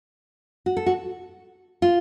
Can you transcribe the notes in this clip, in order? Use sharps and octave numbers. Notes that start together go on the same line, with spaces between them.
F#4
A4
F#4
F4